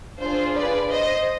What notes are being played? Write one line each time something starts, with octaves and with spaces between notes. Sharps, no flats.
D4 F4 G#4 C5
B4 D5
C5 D#5